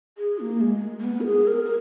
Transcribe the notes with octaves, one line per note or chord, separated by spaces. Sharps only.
G#4
A#3
G#3
A#3
B3
A#4
G#4
A#4
A#4